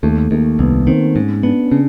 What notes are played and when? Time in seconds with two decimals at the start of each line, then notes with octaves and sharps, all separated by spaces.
0.03 D#2 A3
0.31 D#2 A#3
0.59 C2 B3
0.87 D#3 C4
1.16 G#2 C#4
1.43 B3 D4
1.66 C#4
1.71 C#3 D4